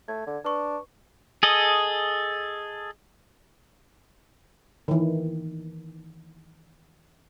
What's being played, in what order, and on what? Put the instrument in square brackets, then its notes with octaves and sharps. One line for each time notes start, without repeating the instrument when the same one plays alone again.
[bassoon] A3 [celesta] G#6
[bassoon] D3
[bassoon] D4 [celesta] B4 C#6
[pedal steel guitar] G#4 A4 D#5
[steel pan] D#3 E3